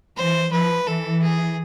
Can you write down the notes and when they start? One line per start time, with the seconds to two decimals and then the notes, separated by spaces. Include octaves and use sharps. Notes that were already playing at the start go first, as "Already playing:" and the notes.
0.17 E3 C5
0.52 F3 B4
0.87 E3 A4
1.23 G#4